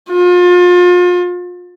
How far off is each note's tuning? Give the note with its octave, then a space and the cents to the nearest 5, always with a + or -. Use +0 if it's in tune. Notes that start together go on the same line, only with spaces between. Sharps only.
F4 +35